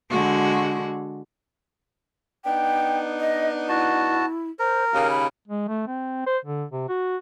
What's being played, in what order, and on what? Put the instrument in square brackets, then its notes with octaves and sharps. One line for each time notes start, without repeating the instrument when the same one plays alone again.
[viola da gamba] D3 G#3 F#4
[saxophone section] B3 D4 D#4 [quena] G5
[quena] D#5
[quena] E4 [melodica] F#4 A5
[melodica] A#4 [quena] C5
[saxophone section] D#2 C#3 A#3 [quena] F5
[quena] B5
[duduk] G#3
A3
C4
C5
D3
C3
F#4